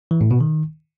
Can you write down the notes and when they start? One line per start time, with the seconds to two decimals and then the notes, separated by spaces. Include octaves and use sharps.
0.11 E3
0.21 A2
0.31 B2
0.41 D#3